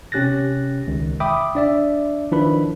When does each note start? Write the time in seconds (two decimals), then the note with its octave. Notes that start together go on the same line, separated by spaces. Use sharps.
0.12 C3 C#4 G4 F#6 A6 A#6
0.87 C#2 D#3
1.20 E5 G5 B5 D6 D#6
1.55 D4 D5 E5
2.31 D#3 F3 D4 E4 B4 B5